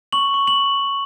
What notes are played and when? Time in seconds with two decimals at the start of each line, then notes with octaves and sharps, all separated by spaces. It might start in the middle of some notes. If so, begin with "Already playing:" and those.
0.12 C#6 F#7
0.34 C#6
0.47 F#7